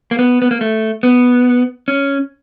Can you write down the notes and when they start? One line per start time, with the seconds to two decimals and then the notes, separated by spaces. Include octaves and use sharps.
0.11 A#3
0.19 B3
0.42 B3
0.51 A#3
0.61 A3
1.03 B3
1.88 C#4